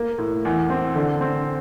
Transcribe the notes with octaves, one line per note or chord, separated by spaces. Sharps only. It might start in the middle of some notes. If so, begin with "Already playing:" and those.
Already playing: A#3
A2
E2
C4
D3
C4